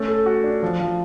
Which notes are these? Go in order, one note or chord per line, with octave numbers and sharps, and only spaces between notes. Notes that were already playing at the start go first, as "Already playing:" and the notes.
Already playing: A3 C#4
A4
F#4
D4
F3
F3